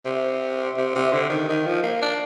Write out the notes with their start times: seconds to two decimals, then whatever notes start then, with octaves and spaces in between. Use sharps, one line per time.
0.06 C3
0.77 C3
0.95 C3
1.13 D3
1.30 D#3
1.48 D#3
1.66 F3
1.83 A#3
2.02 D4